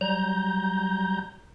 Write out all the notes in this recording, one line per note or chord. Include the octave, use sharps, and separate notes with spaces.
F#3 G3 A#5 G6